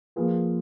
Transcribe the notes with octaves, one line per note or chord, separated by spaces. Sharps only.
F3 A#3 F4 G#4 B4